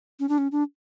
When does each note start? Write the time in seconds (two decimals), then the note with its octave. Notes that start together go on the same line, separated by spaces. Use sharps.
0.20 C#4
0.29 D4
0.38 C#4
0.52 D4